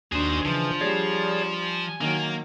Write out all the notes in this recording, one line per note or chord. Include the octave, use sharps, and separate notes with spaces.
D#2 D#3 D4 F#4 G#4 C5 D#6
C#3 E3 F3
G3 G#4 C#5 D5
G#5
D#3 F#3 A#3